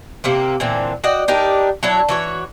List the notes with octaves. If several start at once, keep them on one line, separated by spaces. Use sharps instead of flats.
C3 A#3 C4
A#2 D3 E3 C4
F#4 D5 D#5 G5
D4 D#4 G4 A#4
F#3 D4 E4 C#5
E3 F#4 C#5